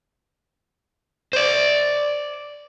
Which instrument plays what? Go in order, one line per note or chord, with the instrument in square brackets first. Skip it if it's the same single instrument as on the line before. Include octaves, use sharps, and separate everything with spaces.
[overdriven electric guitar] C5 D5